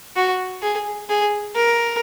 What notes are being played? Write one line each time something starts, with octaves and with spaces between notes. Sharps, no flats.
F#4
G#4
G#4
A#4